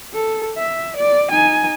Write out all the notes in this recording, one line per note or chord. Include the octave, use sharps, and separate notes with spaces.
A4
E5
D5
D#4 G#5